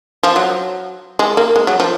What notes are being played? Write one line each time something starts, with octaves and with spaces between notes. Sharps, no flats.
F3
F#3
G#3
A#3
G#3
F#3
F3